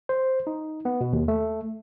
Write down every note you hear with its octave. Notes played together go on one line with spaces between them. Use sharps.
C5
D#4
B3
B2
D#2
A3